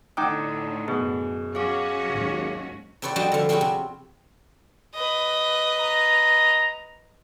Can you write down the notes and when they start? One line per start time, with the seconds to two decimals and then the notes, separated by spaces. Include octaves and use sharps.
0.17 A2 D3 D#4 F#5 G5 A#5 D6 D#6
0.88 F#2 B2 G#4
1.55 F#3 C#4 F#4 G#4 F5 D6
2.11 G#1 D#2
3.02 C3 G4 B4 C#5 D5 F#5
3.16 F2 G3 D4 F#4 D#5 A5
3.32 D3 F3
3.49 F3 C4 F#4 G#4 B4 C#5
3.61 C3
4.95 B4 D#5
5.80 A#5